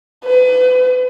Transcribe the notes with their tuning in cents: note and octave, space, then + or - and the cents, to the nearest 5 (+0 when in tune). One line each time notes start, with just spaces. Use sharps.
B4 +35